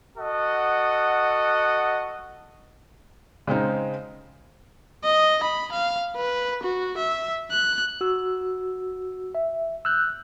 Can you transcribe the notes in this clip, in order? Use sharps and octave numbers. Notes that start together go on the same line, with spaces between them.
F#4 A4 D#5 F#5
C#3 G#3 C4 D#4
D#5
B5
F5
B4
F#4
E5
F#6
F#4 E6
E5
E6 F#6 G6